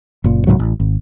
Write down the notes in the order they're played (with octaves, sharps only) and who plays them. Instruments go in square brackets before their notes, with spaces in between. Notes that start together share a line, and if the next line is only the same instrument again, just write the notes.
[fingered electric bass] F#1 A#2
C2 G#2 F#3
A1
G#1